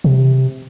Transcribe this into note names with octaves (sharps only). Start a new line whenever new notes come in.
C3